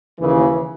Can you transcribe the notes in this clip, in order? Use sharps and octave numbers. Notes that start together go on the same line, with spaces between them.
D#2 C#3 E3